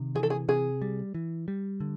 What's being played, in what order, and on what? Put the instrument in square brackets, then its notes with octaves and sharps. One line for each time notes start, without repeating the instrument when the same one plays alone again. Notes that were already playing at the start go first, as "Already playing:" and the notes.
Already playing: [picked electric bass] C3 D#3
[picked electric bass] E3 [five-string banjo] G#4
[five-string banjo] A4
G#4
[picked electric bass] C3 [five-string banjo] G#4
[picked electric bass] G3
E3
G3
D3